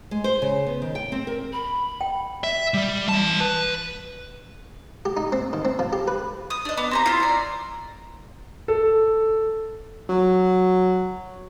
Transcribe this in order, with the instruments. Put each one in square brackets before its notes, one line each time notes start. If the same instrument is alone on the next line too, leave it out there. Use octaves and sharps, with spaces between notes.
[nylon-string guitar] G#3
C5
C#3
B3
D#3
G5
C4
A#4
[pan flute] B5
[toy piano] G5
[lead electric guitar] E5
G3
E3 A5
B4
[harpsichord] G4
D#4
C4
D#3
C4
F3
G4
B4
[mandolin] D#6
D4 D#5
B3 D6
C4 G4 A#5
E4 F4
D5 A#5
[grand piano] A4
[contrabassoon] F#3